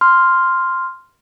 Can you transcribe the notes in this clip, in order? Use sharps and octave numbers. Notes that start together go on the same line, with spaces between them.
C6 F6